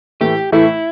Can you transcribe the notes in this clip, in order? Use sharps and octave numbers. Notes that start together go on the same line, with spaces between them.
A2 E3 A3 G4
A2 E3 A3 E4